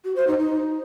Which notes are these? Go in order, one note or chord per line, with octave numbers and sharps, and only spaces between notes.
F#4
C5
D#4
D#4